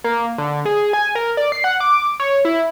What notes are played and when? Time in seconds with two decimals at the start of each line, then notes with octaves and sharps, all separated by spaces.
0.04 A#3
0.38 D3
0.65 G#4
0.93 G#5
1.15 A#4
1.37 D5
1.52 C7
1.64 F#5
1.80 D6
2.20 C#5
2.45 E4